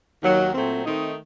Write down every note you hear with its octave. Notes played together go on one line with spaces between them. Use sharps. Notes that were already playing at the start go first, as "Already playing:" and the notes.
D#2 D#3 F#3
A#2 F#3 A3 C4
D#3 A3 C4 D#4